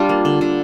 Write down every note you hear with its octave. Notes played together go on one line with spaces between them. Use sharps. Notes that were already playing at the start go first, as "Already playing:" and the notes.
Already playing: G3 D4 F4
A#3
D3
D3